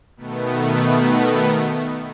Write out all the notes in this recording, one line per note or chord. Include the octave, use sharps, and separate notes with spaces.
B2 D#3 A3 B3